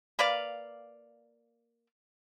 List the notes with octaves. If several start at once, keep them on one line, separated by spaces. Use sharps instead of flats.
A#3 B4 D5 F5